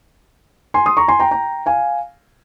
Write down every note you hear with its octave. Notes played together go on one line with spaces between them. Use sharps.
G#5 C6
C6 D#6
A#5 C#6
G#5 C6
G5 A#5
G5 A#5
F5 G#5